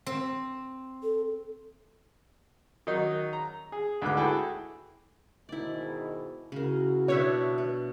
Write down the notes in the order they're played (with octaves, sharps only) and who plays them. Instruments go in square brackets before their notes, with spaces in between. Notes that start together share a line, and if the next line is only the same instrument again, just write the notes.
[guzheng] C4
[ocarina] A4
[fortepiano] D#3 F#3 D#4
A#5
G#4
D2 G#2 D3 B4 D6
E4 F#4 G#4 A4 G5
[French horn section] G#2 B2 D#3 [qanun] E4 D5
[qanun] C#3 A#4 [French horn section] E4 F#4
[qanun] B2 D4 B5 [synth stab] C#5 E5
[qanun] B3